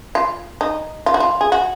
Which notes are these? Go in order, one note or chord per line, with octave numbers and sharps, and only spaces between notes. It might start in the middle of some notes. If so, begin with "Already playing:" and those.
F4
D#4
F4
F#4
F4
G#4
F#4